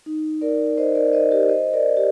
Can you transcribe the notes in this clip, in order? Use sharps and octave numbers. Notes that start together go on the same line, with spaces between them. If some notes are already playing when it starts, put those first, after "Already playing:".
D#4
A#4 D5
C5 D#5
A#4 D5
C5 D#5
G4 A#4
C5 D#5
A#4 D5
G4